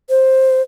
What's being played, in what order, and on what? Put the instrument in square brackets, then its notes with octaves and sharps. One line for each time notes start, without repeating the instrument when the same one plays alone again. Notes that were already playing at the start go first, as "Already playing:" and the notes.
[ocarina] C5